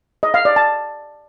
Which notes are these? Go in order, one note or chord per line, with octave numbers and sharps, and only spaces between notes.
D#5
F5
D5
A5